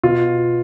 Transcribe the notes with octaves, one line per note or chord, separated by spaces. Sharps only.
B2 F4